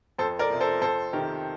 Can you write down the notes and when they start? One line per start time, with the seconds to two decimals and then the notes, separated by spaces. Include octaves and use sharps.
0.18 F2 A4 C5
0.39 A#4 D5
0.50 C3 F3
0.60 A4 C5
0.81 F2 A4 C5
1.13 C3 D#3 G4 A#4